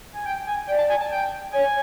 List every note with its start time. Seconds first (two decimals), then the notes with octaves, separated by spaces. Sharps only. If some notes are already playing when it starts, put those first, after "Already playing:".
0.13 G#5
0.26 G5
0.47 G#5
0.68 D5 G5
0.78 A5
0.90 G#5
1.00 A5
1.11 G5
1.52 C#5 G#5